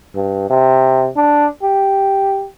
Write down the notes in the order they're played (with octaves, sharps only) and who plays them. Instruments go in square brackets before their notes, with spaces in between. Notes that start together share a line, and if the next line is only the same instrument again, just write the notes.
[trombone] G2
C3
D4
G4